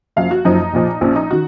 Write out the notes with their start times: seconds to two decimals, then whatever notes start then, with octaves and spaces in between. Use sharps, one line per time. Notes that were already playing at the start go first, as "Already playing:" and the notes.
0.16 F#1 F#2 F3 F5
0.31 F#4
0.45 F#1 F#2 F3 D#4
0.73 A#1 A#2 F3
1.01 A#1 A#2 F3 C#4
1.16 D#4
1.31 D#3 F#4